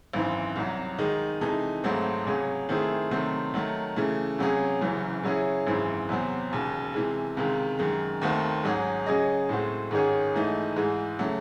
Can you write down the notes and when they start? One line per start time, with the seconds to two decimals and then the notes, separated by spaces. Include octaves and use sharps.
0.13 G#1 F#2 E3 C4
0.56 C2 C3 F#3
0.99 D#3 G#3 D#4
1.41 C3 E3 G#3 D#4 A4
1.84 G#1 G#2 F#3 A3 C4
2.26 C#2 C3 F#3 C#4 G#4
2.69 D#3 A3 C4 E4 G#4
3.11 C3 D#3 F#3 A3 C4
3.54 D#3 F#3 A3
3.96 C#3 E3 A3
4.39 C#2 C3 F#3 C#4 G#4
4.81 F#1 F#2 C#3 E3
5.24 C#3 F#3 C#4 E4 G#4
5.67 G#1 F#2 E3 G#3 C4
6.09 E2 C3 F#3 C4
6.51 E1 D#2 C#3
6.94 C3 E3 G#3
7.37 C#2 C3 D#3 G#3
7.79 F#2 D#3 G#3
8.21 D#2 D#3 A3 C4 F#4
8.64 G#2 F#3 C#4 G#4
9.06 C#3 F#3 C#4 G#4 D#5
9.49 A2 G#3 C4 F#4
9.91 G#2 D#3 G#3 C#4 G#4
10.34 G#2 E3 A3 D#4
10.76 G#2 E3 G#3
11.19 C#3 F#3 A3